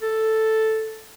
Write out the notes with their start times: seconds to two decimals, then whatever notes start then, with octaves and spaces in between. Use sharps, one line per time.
0.02 A4